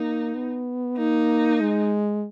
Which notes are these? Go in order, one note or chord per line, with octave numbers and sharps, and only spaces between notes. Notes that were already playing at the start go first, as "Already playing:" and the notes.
Already playing: A#3 D#4
B3
A#3 D#4
G#3